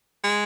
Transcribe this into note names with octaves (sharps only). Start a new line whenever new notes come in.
G#3